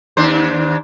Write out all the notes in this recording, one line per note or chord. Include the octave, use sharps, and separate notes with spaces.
D#2 D4 C5